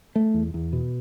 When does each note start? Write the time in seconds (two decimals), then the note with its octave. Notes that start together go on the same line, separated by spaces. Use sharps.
0.16 A3
0.34 E2
0.54 E2
0.73 B2